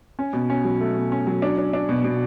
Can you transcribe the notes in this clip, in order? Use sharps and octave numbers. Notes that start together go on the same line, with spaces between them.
C#4
B2
C#4
F#3
A3
B2
C#4
F#3
D4
D4
D4
B2
B2